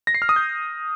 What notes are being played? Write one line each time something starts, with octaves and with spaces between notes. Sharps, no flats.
A#6
C7
F6
D#6
G6